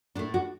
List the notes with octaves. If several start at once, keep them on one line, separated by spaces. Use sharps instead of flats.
A2 A3 D4
D4 F#4